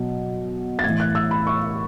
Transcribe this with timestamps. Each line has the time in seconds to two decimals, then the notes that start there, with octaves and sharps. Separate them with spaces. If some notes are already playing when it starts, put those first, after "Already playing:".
Already playing: B2 F#3
0.79 A6
0.84 A2 E3 G#6
1.00 F#6
1.15 E6
1.31 B5
1.47 C#6